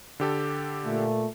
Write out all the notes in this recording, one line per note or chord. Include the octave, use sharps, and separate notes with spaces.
D3 G4 A4
A#2 A3